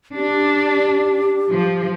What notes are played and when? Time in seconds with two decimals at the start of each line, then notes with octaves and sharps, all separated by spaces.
0.15 D4 G4
1.49 F3